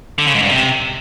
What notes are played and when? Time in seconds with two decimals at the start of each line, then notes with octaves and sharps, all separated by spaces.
0.18 D3
0.26 C#3
0.34 G#2
0.42 G2
0.50 C3